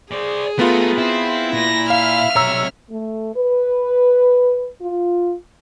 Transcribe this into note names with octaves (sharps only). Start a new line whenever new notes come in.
G#4 C5 D5
A3 B3 F4 A#4 B4
C4 E4
A#2 A#6
E5 F5 F6
B1 C3 C#5 A#5 E6
A3
B4
F4